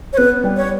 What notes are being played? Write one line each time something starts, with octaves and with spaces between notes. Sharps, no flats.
C#5
B3 B4
G3
C#5